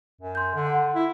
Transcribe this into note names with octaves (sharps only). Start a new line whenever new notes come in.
F#2
C6 G6
D3
F#5 C6
E4